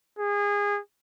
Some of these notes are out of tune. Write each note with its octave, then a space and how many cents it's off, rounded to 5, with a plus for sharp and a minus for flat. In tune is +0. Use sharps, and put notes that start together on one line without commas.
G#4 -25